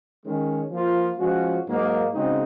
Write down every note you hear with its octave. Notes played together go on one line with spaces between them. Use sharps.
D#3 G#3 C#4
F3 A#3 F4
F3 G#3 C#4 F#4
G#2 F#3 A#3 D#4
C#3 G#3 C4 D#4 F#4